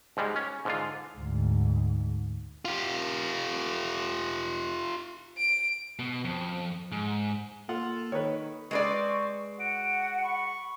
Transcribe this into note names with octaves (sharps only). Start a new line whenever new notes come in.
G#2 G3 G#3
C#4
G#2 D3 F4
D2 G#2
F4 G4
D7
B2
F2
G#2
A#3 F4 A4 F#5
D#3 B4 C#5
G#3 C4 B4 D5 C#6
F#4 F#5 D7
B5 C#6